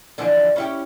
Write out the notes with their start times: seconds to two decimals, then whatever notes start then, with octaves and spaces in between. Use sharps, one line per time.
0.18 D3 E3 F3
0.56 C#4 E4 G4